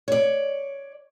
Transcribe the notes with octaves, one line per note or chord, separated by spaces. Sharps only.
C#5 D5